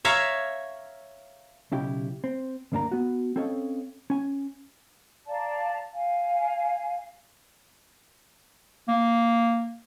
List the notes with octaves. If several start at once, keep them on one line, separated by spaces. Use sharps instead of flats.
C#5 E5 F5 A#5
B1 C#3 E4 G4
C4
D2 G2 A#3 D4 A#4 A#5
B3 F#4
C4 C#4 A4 C#5 D#5 F5
C#4 G#5
D5 F5 A5 A#5
F5 G#5
A#3